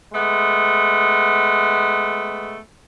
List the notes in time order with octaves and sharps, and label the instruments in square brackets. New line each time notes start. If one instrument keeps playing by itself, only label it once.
[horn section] G#3 A3 B3